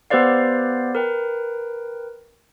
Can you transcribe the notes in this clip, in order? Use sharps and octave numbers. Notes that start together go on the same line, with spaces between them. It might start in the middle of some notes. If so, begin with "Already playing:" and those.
B3 G4 B4 C5 D5 F5
A#4 B4 G5